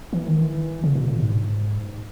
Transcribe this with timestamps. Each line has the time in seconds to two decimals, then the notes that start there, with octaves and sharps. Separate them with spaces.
0.13 E3
0.28 D#3
0.42 E3
0.84 C#3
0.95 B2
1.08 A#2
1.20 G#2